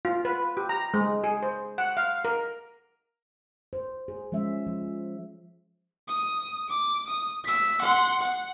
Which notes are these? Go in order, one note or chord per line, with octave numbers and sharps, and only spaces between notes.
F4
B4
G4
A#5
G#3
G#4
C5
F#5
F5
A#4
C5
G#4
F3 G#3 C#4 E5
F3
D#6
D6
D#6
E6 B6
F#5 C6
F#5